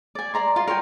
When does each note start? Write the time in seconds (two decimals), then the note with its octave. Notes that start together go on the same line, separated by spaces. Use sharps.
0.15 D5 G#5
0.34 D5 A#5 C6
0.56 F4 C6
0.67 A#4 C#5 G5 G#5